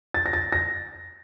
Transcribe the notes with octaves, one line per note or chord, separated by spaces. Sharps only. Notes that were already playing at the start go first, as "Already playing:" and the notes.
A6
A#6
A6
A#6